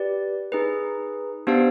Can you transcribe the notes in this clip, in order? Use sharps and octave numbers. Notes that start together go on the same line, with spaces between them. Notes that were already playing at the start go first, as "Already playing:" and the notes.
Already playing: G4 B4 D5
D#4 G#4 B4
B3 D4 G4 C5 F5